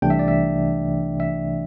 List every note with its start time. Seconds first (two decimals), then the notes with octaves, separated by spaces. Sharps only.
0.02 C2 C3 E3 A3 D4 G5
0.10 E5
0.19 D5
0.28 E5
1.20 E5